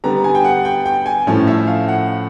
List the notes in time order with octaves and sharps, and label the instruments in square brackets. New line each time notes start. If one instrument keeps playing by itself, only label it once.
[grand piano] D3 G3 B3 A#5
G#5
G5
F#5
G5
G5
G#5
A2 F3 A3 C#4
E5
F5
F#5